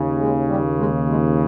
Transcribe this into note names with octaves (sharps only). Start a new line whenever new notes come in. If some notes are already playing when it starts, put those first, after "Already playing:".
Already playing: D#2 C#3
G#3
G3
G#3
G#3